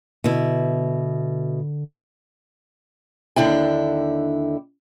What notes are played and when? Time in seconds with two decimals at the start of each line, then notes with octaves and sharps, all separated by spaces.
0.24 B2 D3 E4
3.36 D#2 D3 D4 E4 G5